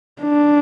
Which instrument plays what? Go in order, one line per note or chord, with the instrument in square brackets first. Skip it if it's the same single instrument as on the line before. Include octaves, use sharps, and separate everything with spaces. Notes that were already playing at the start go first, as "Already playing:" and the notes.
[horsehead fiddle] D4